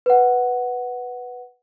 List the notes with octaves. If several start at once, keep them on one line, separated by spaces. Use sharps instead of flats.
B4 F#5